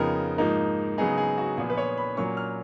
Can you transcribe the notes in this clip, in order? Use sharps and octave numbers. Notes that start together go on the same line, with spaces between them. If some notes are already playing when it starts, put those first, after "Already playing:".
Already playing: F2 C#3 F3 B3 D#4 A#4
G#2 F3 A#3 D#4
C#3 F#3 B3 D#4 G#4
G#4
F#4
A#2 F3 B3 G#4
B4
C#5
B5
A#2 F#3 A#3 C#4 C#6
F6